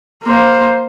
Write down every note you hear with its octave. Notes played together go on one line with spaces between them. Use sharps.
A#3 C5